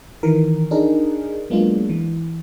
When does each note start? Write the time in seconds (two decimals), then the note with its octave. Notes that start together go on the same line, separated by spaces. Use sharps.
0.23 D#3 E3 A#4
0.71 D4 D#4 G#4 A#4
1.50 F#3 G#3 A#3 B3 D4 F4
1.89 E3